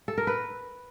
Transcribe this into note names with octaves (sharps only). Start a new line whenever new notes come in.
A4
A#4
B4